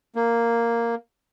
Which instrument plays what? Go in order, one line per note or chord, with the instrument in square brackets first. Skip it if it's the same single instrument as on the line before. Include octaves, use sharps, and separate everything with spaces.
[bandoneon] A#3